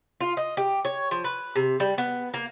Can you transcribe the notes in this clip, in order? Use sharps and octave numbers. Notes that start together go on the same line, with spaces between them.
F4
D#5
G4
C#5
F3
B4
C3
G3
B3
A#3